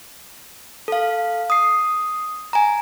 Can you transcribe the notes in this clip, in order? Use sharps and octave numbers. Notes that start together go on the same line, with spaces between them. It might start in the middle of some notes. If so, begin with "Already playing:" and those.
A4 F5
D#6 C7
G#5 A#5